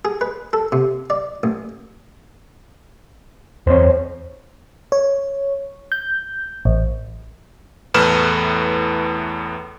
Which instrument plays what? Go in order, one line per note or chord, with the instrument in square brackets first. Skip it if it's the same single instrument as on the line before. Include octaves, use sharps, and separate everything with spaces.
[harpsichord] G#4
B4
A4
C3
D5
A1
[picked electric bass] E2 C4 [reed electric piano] C5 C#5
[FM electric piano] C#5
G6
A1
[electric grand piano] E2 A2 A3 B4 F6 E7